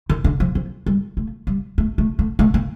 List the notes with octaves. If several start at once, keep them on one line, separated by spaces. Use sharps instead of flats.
D#3
D3
F3
F3
G3
A3
G3
A3
A3
A3
A3
A#3